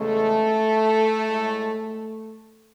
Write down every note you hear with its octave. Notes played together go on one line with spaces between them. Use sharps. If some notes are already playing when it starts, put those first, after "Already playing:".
Already playing: E2 C#3 G#3 A3
A2 G#3